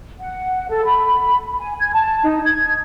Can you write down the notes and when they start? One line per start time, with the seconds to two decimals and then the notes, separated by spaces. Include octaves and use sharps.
0.20 F#5
0.69 A4
0.85 B5
1.59 G#5
1.80 G#6
1.93 A5
2.24 D#4
2.44 G#6